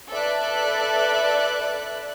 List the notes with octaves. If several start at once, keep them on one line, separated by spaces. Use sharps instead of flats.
A4 B4 D5 E5 A5 F#6